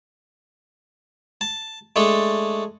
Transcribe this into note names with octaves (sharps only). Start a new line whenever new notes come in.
A5
G#3 A3 D4 A4